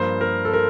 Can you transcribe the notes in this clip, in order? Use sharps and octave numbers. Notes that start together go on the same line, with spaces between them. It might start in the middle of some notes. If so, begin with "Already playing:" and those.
Already playing: G2 F3 A#3 C5
A#4
A4
A#4